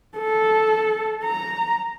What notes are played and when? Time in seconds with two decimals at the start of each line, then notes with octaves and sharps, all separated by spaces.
0.18 A4
1.24 A#5